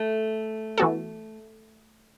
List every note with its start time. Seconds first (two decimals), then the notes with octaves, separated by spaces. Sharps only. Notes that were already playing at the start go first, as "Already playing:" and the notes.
Already playing: A3
0.78 E3 B3 F#4 A4